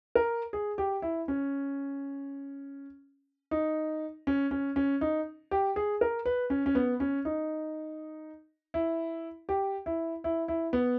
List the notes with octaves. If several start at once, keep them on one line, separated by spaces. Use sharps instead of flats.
A#4
G#4
G4
E4
C#4
D#4
C#4
C#4
C#4
D#4
G4
G#4
A#4
B4
C#4
C#4
B3
C#4
D#4
E4
G4
E4
E4
E4
B3